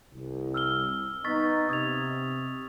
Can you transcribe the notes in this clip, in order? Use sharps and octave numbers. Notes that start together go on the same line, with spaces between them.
C2
E6 F6 G7
B3 D#4 C#6 A6 B6
C3 D#6 G#6 F7